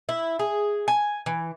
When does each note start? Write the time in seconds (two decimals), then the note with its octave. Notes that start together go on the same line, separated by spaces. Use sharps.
0.09 E4
0.39 G#4
0.88 G#5
1.26 E3